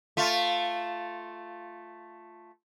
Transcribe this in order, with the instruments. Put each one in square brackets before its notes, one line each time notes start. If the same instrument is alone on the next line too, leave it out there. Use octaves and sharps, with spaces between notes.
[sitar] A3 F4